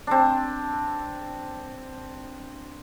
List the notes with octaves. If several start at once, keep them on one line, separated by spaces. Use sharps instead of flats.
C4 D4